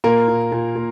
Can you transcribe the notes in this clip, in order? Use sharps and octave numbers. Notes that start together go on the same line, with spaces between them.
A#2 A#3 A#4
A#2
A#2
A#2